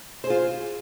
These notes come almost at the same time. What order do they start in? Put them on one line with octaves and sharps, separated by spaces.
C5 G#4 F4